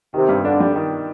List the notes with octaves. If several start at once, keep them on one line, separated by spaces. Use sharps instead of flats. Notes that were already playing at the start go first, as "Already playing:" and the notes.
C3 D#3
G2
D3 D4
G3
D#3